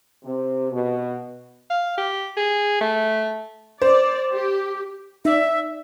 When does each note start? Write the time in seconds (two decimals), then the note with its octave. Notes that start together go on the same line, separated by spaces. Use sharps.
0.25 C3
0.72 B2
1.70 F5
1.98 G4
2.37 G#4
2.81 A3
3.82 C5 D5
4.33 G4
5.25 D#4 D5 E5